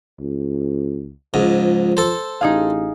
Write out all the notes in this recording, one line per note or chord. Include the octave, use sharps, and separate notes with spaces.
C#2
C#2 G#2 F3
A4 C5
A1 D#4 G#4 F5